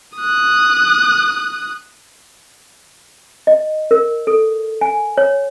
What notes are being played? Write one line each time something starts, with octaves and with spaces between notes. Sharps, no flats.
D#6 F#6
D#5
A#4
A4
G#5
C#5